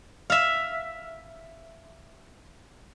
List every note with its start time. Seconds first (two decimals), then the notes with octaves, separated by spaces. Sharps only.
0.30 E5 F5